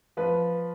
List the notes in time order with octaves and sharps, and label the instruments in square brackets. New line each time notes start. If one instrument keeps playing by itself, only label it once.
[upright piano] F3 B4